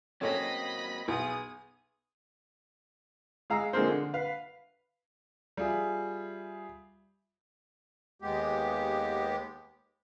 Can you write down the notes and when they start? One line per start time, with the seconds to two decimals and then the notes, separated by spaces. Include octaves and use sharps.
0.21 F#3 A#3 C4 C#4 A4 C#5 D#5 B5
1.08 B1 G#4 D#6
3.50 G#3 F5 A#5 E6
3.73 D3 F3 G#3 A#3 C4
3.90 D3
4.14 B4 F5
5.57 G3 F4 G#4 E5
8.22 D#2 G#3 B3 G4